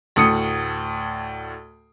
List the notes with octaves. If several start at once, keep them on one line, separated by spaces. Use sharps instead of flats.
D2 A2 D#6 C#7